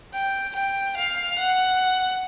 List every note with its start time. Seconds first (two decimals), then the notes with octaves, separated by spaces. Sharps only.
0.13 G5
0.55 G5
0.97 F5
1.38 F#5